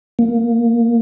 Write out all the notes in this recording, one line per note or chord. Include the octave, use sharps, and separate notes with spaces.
A#3